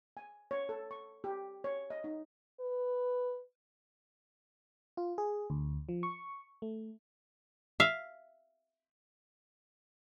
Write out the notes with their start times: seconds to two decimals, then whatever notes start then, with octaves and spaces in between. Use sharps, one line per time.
0.17 G#5
0.51 C#5
0.69 A4
0.91 C#6
1.24 G4
1.64 C#5
1.90 D#5
2.04 D#4
2.60 B4
4.97 F4
5.18 G#4
5.50 D2
5.89 F3
6.03 C#6
6.62 A3
7.80 E5 F5